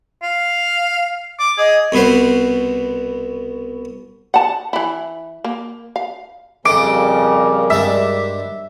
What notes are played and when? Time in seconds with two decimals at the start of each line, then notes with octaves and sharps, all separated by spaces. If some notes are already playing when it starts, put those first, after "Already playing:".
0.23 F5
1.39 D6
1.58 G#4 D#5
1.92 C2 B2 B3 B4 C5
4.34 F#5 A5
4.73 E3 E4
5.44 A#3
5.96 F5
6.65 F2 C#3 G3 A4 A#4 D#5 D6
7.70 G2 G#3 D5 E5